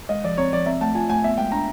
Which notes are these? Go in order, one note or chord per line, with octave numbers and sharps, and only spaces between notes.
G#3 D#5
F3 D5
C4 C#5
F3 D5
C4 E5
A3 A5
F4 G#5
A3 G#5
B3 E5
G#3 G5
D4 A#5